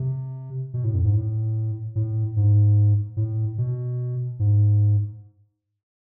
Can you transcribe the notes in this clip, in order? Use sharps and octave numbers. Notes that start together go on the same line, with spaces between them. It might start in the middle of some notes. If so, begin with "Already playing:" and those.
Already playing: C3
B2
A2
F2
G#2
A2
A2
G#2
A2
B2
G#2